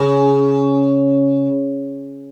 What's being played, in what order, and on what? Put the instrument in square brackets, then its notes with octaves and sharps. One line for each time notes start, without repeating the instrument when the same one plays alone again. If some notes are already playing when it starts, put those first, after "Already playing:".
Already playing: [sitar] C#3